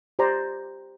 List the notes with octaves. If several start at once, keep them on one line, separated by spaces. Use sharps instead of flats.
G4 C5 D5 A#5